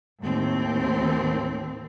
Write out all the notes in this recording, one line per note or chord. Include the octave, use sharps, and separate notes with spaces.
D#2 A2 C4